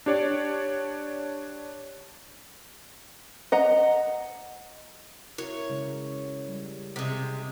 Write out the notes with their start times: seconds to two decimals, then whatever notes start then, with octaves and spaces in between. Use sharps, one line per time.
0.06 D4 G4 C#5 D5
3.52 D#5 F#5 A#5
5.38 E4 F#4 A#4 C#5
5.70 C#3 G#3
6.49 G3
6.96 C3 G#3